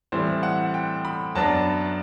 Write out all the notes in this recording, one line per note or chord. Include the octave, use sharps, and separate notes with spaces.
A2 E3 G3 C4 C5
F#5
G5
B5
F#2 F#3 B3 D4 A5